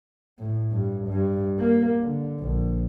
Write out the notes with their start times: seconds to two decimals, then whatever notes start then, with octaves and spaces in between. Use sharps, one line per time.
0.39 A2
0.71 G2
1.07 G2
1.59 A#3
2.02 D3
2.39 A#1